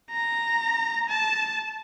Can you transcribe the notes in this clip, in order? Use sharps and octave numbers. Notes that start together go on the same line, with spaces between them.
A#5
A5